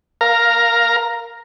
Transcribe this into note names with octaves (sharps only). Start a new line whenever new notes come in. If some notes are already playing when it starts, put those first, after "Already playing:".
A#4 F5 A#5